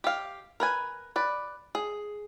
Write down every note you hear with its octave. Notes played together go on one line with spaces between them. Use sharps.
G4 F5
A#4 B4 G#5
B4 D5
G#4